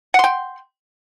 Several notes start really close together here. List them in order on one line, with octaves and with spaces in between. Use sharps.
F#5 C6 G5